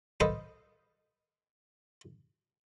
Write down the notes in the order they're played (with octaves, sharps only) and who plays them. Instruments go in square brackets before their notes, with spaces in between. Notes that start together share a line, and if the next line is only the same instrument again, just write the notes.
[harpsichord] A4 B4 C5 D#5 F5 A5